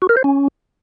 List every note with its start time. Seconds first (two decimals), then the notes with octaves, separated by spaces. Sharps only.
0.02 F#4
0.09 A#4
0.17 C5
0.24 C#4